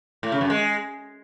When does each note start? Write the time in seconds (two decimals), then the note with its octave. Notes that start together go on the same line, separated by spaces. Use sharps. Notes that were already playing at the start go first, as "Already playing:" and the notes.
0.23 A2
0.32 C#3
0.41 F#2
0.50 G#3